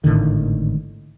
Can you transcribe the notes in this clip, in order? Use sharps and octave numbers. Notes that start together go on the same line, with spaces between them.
G#1 A2 D3 D#3